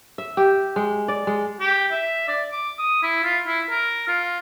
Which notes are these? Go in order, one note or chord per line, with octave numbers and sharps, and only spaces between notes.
E5
G4
G#3
D5
G#3
G4
E5
D5
D6
D#6
E4
F4
E4
A#4
F4